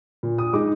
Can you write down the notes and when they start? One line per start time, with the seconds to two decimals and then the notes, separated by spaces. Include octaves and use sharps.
0.23 A#2
0.38 D#6
0.53 G#3 D#4 D6